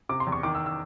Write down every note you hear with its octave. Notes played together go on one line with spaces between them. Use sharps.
C3 D6
C6
E2
C#6
D#3 D6
E6
E6